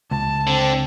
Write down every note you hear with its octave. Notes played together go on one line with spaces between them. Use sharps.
C#2 A5
D3 C4